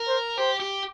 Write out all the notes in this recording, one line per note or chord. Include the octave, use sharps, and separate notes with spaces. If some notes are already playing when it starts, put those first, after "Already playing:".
Already playing: A#4
C5
G4 C5
G4